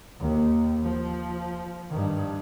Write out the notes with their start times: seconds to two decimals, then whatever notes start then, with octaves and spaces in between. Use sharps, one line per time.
0.19 D#2 D#3
0.83 F3
1.90 G2 D#3